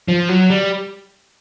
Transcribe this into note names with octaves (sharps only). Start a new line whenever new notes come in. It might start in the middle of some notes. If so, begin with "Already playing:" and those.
F3
F#3
G3